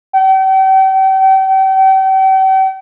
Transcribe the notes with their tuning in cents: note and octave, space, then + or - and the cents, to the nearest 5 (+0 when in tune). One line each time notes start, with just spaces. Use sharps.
G5 -40